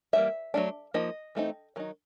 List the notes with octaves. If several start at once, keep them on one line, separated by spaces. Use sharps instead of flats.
E3 G3 A#3 E5
F#3 A3 D4
F3 A#3 D#4 D#5
E3 A3 C4 D#4
D#3 F#3 D#4